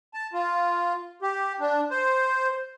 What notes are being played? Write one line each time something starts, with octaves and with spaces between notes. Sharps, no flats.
A5
F4
G4
D4
C5